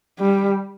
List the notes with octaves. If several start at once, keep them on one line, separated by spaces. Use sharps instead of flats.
G3